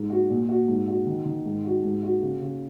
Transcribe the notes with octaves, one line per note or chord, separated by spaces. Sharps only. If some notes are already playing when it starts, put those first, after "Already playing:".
Already playing: G#2
F#4
A#2
F#4
G#2
F#4
D#3
D#3
G#2
F#4
G#2
F#4
C#3
C#3